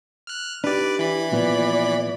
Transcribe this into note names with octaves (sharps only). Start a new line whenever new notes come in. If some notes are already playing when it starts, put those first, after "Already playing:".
F6 F#6
D4 D#4 G4 B4 D5
E3 E4 B5
A#2 F3 B3 D5